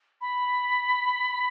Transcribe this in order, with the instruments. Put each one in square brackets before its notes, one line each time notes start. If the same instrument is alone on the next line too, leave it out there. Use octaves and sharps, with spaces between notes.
[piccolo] B5